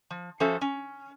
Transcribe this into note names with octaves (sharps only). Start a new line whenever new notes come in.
F3
F3 C#4 F#4 A4 C5 E5
C#4